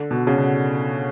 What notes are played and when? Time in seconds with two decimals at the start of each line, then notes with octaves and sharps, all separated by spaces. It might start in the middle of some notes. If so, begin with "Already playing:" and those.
Already playing: D3
0.11 B2
0.27 C#3
0.37 B2